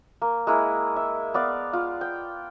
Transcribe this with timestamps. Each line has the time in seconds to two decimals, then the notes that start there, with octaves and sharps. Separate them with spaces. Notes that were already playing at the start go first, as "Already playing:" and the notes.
0.21 A#3
0.47 G#3 A#3 E4
0.96 E5
1.34 B3 D5 F5
1.73 F4
2.01 G5